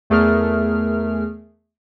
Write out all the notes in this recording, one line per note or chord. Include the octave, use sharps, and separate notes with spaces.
E2 A3 G#4 A#4 F6